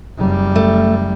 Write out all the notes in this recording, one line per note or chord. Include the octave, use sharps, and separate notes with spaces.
F#1 G3
A3